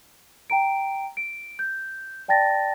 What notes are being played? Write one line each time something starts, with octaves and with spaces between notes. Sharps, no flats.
G5 A#5 D7
D7
G6
D5 G5 A5 A6 A#6